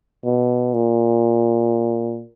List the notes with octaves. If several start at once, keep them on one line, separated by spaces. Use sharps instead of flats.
B2
A#2